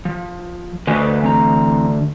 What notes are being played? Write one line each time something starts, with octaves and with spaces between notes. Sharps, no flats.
F3
D2 B4 D#5 G#5
E3 C4 A#5